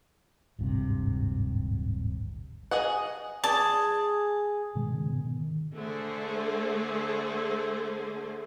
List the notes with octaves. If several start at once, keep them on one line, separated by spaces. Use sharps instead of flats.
D1 G#1 G2 C3
G#4 D#5 F#5
G#4 D5 A5
G2 B2 D#3 G#3
C#3
G#2 B2 D3 B3
D#3
D3 A3 G#4 C5